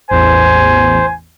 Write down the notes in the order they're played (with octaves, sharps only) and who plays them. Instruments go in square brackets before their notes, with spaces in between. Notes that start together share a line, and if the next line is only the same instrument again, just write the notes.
[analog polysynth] A1 E2 [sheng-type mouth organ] C5 [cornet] G#5